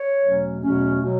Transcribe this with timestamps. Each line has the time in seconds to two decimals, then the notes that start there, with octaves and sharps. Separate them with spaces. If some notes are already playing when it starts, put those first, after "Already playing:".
Already playing: C#5
0.22 E2 B2 F#3 A3 C#4
0.62 E2 B2 F#3 A3 C#4
1.02 B2 F#3